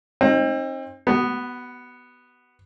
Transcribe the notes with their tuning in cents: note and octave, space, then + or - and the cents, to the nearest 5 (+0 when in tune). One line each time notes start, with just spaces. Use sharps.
C4 +35 D#4 +0
B3 +0 F#4 +40